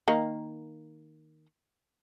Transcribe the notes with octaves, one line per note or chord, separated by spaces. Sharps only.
D#3 A#3